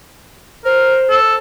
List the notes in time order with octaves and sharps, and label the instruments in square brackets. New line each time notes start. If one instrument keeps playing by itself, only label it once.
[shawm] A#4 [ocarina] C5
[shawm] A4